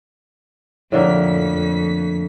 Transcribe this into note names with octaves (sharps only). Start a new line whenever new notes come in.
F2 A2 D3 A#3 B6